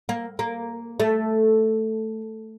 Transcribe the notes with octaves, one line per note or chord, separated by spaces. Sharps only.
A#3
A#3
A3